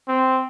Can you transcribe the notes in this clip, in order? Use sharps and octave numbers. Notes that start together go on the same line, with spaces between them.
C4